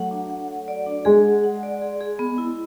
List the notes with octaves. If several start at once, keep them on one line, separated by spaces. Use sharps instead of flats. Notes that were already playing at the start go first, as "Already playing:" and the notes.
Already playing: F#3 A3 F#5
D4
F#5
F#5
D5
D4
G#3 G#4
F#5
F#5
D5
G#4
G#4
B3
E4